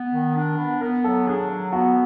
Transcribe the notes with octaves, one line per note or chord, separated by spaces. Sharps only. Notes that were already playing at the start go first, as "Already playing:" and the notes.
Already playing: B3
D#3
D4
B3
B3 A#4
F#3 A4
D4 G#4
F#3
B3 F#4